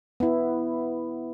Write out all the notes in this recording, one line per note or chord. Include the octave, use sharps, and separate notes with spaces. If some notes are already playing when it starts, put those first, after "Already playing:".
B3 E4